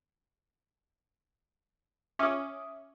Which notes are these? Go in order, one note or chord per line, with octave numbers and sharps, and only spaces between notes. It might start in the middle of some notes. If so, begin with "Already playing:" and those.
C#4 E5 D6 D#6